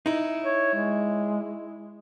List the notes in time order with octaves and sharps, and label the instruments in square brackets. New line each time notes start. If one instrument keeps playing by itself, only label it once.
[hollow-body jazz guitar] D#4 E4
[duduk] C#5
G#3